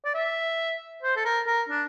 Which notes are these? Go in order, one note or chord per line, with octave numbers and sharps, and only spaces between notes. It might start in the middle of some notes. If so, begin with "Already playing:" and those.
D5
E5
C5
A4
A#4
A#4
D4